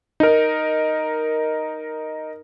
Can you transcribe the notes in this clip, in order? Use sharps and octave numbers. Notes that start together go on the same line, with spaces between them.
D#4 A#4